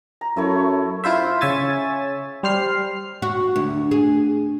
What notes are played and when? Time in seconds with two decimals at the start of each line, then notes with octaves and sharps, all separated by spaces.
0.21 A#5
0.36 F#2 A3 E4 C#5
1.04 E4 F4 C5 E5
1.41 C#3 C#5 E5 G#5 A6
2.43 G3 C5 F6 C7
3.22 F#4
3.56 D2
3.91 G#4